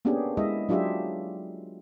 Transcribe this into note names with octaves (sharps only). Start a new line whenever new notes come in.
A#3 B3 C#4 D4 G4 G#4
G#3 E4 D#5 E5
F#3 D4 F4 G4 G#4 E5